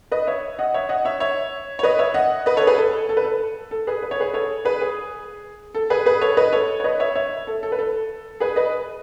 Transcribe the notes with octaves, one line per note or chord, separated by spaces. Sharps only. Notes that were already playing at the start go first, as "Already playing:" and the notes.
B4 D#5
C#5 E5
D#5 F#5
C#5 E5
D#5 F#5
C#5 E5
C#5 E5
C#5
B4 D#5
C#5 E5
D#5 F#5
B4 D#5
A4 C#5
G#4 B4
A4
A4
B4
A4
A4
G#4 B4
B4
C#5
G#4 B4
A4 C#5
G#4 B4
G#4
A4
G#4 B4
G#4 B4
A4 C#5
B4 D#5
A4 C#5
C#5
B4 D#5
C#5 E5
C#5 E5
A4
A4
B4
A4
G#4 B4
B4 D#5